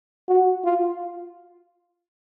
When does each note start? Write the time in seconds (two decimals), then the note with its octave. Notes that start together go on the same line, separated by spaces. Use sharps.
0.29 F#4
0.65 F4